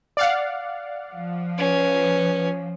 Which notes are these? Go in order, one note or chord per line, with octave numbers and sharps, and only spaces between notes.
D5 F5 F#5
F3
C#4 B4